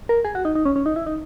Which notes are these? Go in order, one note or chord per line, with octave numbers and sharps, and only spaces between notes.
A#4
G#4
F#4
D#4
D#4
C#4
C#4
D#4
E4
D#4